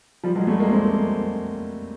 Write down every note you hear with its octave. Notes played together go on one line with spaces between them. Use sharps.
F3 G3
F#3 G#3
G3 A3
G#3 A#3
A#3 C4